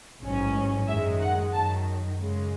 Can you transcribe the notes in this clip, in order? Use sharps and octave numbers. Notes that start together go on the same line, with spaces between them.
A1 G#2 F#3 C#4
F#2 D#3 G#3 E5
F#5
F#2 D#3 F#3 A5
F#2 C#3 G#3